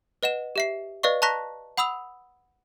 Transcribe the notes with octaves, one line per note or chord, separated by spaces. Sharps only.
B4 D#5 F#5 E7
G4 E5 C7
B4 D5 D#5 F5 C#6
A5 A#5 C#6 F#6 A#6 B6
F#5 B5 D#6 E6 F7